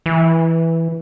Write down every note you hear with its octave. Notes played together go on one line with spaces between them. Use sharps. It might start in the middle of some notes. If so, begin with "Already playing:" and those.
E3